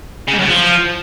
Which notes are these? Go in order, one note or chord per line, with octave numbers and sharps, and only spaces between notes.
C#3
G#2
F#2
C#3
F3